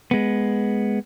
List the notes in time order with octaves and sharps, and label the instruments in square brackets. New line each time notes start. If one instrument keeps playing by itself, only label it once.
[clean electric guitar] G#3 B3